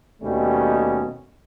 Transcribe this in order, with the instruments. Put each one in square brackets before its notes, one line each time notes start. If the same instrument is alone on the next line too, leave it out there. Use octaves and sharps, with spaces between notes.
[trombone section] D#2 B2 G3 A3 C#4